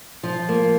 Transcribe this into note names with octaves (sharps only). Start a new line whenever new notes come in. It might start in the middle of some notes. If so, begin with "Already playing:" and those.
F3
A#3